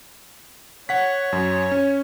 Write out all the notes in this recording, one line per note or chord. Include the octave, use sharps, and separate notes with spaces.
C#5 F#5 B6
F#2
C#4